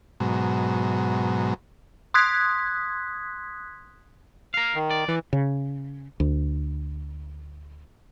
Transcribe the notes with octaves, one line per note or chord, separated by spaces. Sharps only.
G#2 B2 F#3
C6 D#6 F#6 G#6 B6
A#4 F5
D#3
D5
E3
C#3
D2